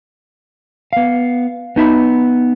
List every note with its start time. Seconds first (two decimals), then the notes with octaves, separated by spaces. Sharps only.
0.93 B3 F5
1.76 B3 D#4 E5 B5